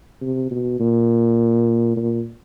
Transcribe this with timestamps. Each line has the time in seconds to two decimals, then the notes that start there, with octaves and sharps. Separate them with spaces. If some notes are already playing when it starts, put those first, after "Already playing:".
0.21 C3
0.51 B2
0.80 A#2
1.96 A#2